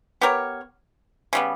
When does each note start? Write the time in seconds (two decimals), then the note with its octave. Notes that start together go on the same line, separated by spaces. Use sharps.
0.21 B3 G4 A#4 C#5
1.33 C#3 G3 B3